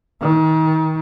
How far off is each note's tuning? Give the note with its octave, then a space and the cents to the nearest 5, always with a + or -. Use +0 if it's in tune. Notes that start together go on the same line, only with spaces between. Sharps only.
D#3 +30